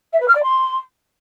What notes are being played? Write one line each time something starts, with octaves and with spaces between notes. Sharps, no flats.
E5
B4
F6
D5
C6